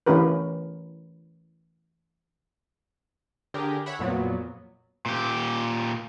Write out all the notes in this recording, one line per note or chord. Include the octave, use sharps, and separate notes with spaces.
E3 A3 C#4 G4 A#4 B4
D3 G4 G#4 A#4
C#5 E5 F#5 B5
F2 A#2 F#3 B3
A#2 G4